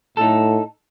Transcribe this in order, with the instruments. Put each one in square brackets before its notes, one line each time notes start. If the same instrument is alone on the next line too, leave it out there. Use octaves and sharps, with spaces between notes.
[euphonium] A2 [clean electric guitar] D#4 A4